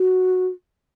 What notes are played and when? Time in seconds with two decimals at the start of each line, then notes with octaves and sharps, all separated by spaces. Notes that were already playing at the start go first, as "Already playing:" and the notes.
Already playing: F#4